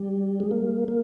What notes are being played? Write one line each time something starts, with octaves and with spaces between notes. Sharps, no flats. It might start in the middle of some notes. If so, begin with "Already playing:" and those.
Already playing: G3
G#3
A#3
A#3